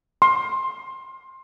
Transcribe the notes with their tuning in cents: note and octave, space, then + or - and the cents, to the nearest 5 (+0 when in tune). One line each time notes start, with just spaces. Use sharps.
C6 +20